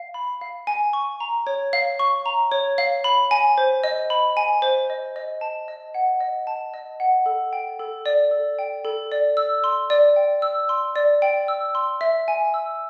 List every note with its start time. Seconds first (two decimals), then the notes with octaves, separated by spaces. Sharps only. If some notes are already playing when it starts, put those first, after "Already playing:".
Already playing: F5
0.14 B5
0.41 F5
0.67 G#5
0.93 C#6
1.20 A#5
1.47 C#5
1.73 F5
1.99 C#6
2.26 A#5
2.52 C#5
2.78 F5
3.04 B5
3.31 G#5
3.58 C5
3.84 D#5
4.10 B5
4.37 G#5
4.62 C5
4.90 D#5
5.16 D#5
5.41 A5
5.68 D#5
5.94 F#5
6.21 D#5
6.47 A5
6.74 D#5
7.00 F#5
7.26 A4
7.53 G5
7.79 A4
8.06 D5
8.31 A4
8.59 G5
8.85 A4
9.12 D5
9.37 E6
9.64 C6
9.90 D5
10.16 G5
10.42 E6
10.69 C6
10.96 D5
11.22 G5
11.48 E6
11.75 C6
12.01 E5
12.28 G#5
12.54 E6